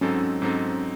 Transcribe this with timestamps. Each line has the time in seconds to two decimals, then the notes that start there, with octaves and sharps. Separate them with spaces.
0.01 G#2 F#3 C4 C#4 D#4 A4
0.42 G#2 F#3 C4 D#4 A4